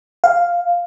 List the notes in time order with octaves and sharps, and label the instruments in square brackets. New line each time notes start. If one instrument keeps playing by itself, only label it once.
[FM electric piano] F5